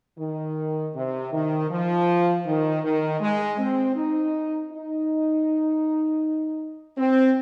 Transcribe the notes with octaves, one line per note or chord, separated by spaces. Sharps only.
D#3
C3
D#3
F3
D#3
D#3
G#3
C4
D#4
D#4
C4